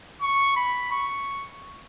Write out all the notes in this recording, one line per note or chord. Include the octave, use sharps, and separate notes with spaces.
C#6
B5
C#6